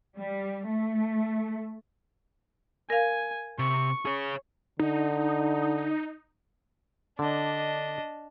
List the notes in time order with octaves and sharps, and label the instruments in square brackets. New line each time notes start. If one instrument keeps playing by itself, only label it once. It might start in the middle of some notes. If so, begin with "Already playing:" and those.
[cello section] G3
A3
[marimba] A#4 F5 [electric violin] G#5
[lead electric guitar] C3 [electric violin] C#6
[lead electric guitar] G#4 C#5
[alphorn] D3 [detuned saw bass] D#4
[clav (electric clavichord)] D3 [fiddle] D4 D#5